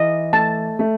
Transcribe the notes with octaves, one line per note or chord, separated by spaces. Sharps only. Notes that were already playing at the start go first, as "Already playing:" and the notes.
Already playing: E3 D#5
A3 A5
A3